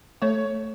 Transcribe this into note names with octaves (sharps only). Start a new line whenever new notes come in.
A3 C#5